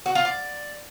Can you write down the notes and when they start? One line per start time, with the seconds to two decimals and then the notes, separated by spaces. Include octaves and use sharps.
0.06 F#4
0.15 F4
0.25 D5